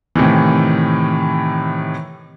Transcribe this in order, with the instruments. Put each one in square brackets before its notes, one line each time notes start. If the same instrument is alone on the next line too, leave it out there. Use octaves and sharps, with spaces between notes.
[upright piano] A2 C3 D#3 E3